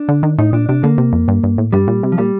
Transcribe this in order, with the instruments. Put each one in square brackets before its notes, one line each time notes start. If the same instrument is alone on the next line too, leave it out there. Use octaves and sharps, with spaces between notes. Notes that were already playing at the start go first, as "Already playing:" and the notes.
Already playing: [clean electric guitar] D4
[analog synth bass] D3
D#3
[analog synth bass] A2 [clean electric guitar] D#4
[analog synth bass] A#2 [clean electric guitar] D4
[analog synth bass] C3 [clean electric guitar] D4
[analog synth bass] D3 [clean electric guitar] A#3
[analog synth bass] C3
F2
G2
G2
A2
[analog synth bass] G2 [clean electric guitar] G3
[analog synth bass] A#2
C3
[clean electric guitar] F3
[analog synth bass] A#2 [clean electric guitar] G3